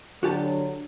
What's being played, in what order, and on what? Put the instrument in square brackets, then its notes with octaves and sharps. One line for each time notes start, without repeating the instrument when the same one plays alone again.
[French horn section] D3 F#3 [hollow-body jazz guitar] F#4 G4 A5